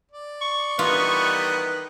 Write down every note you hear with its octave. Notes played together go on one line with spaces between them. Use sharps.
D5
C#6
D#3 E3 G3 B3 F4 B4 D#5